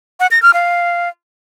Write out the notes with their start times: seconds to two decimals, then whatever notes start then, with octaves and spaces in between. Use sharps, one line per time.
0.20 F#5
0.31 A#6
0.42 F6
0.54 F5